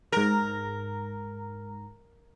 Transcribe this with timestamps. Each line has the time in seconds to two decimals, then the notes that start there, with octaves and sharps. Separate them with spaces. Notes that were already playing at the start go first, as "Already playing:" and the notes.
0.12 G#2 A#4 A#5